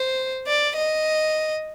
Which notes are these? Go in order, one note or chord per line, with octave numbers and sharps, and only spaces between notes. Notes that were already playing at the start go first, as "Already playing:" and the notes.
Already playing: C5
D5
D#5